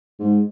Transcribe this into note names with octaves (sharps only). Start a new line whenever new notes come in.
G#2